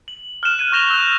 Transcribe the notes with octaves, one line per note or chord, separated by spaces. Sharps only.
F#7
F6 F#6 E7
F#6 G#6 D#7 E7
C#6 G6 A#6 E7 F7 G7
E6 F#6 G6 F7